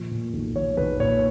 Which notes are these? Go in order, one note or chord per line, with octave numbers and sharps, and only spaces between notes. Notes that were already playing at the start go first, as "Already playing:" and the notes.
Already playing: A#2 F3
A#2
B1
F3 C#5
B1 B4
A#2 C#5